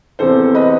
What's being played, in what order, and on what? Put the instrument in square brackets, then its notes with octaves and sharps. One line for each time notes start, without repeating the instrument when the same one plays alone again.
[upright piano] E2 C3 E3 A4 C5
B4 D#5